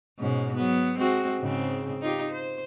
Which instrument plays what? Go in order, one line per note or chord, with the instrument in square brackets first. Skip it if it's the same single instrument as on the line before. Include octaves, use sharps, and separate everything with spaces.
[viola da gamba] G#2 B2 C#4
F#3 B3
G#3 C4 F#4
G#2 C#3 C4
D#4 F4 G4
C5